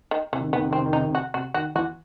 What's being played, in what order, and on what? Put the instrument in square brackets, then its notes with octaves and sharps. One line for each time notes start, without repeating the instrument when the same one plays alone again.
[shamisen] D#3
[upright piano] C3 [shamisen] E3
[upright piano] D#3
C3
[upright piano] D#3 [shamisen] B3
[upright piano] C3
[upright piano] D#3 [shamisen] C4
[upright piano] C3
D#3
[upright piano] C3 [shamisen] D#4
[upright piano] D#3
C3
[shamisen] F#4
[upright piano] C3 [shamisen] F#4
[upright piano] D#3 [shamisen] F#4
[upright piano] E3 [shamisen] F#4